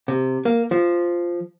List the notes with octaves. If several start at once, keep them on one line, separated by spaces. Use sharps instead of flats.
C3
A#3
F3